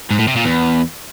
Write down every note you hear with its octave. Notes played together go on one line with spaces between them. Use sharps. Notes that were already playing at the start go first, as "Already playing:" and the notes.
G#2
A2
C3
A#2
E2